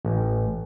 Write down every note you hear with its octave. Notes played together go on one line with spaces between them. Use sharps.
A1